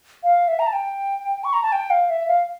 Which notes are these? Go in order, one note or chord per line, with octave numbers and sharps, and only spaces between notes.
F5
E5
A#5
A5
G5
C#6
A#5
A5
G5
F5
E5
F5